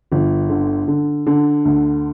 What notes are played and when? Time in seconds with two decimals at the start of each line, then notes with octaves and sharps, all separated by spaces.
0.12 G1
0.50 D3
0.88 D3
1.26 D3
1.65 D2